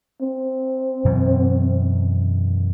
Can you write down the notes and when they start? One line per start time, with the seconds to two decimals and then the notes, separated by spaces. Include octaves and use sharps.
0.21 C4
1.05 F#2 B2 E3